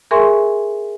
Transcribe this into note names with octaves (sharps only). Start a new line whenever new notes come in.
G#4 A#4 E5 G#5 C6 C#6